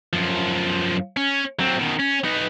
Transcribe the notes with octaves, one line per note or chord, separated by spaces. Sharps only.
F#2 F3
C#4
F#3 C4
B2 D#3
C#4
B3 D#4